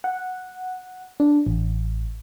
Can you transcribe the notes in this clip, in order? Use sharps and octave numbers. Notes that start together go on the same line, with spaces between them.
F#5
D4
A1